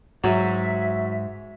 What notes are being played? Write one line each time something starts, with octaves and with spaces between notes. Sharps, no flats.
G#2 F#3 F#4 E5